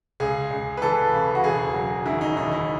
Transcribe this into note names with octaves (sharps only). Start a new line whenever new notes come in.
C#2 G#4
C#2
B4
E3 A4
C#3
F#4
E1 G#4
F#3
D#3 E4
D#4
D#2 D#4
E4